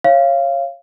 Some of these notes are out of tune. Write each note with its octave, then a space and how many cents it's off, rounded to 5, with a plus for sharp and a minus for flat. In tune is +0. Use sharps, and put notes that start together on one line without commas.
C#5 -20 F5 -20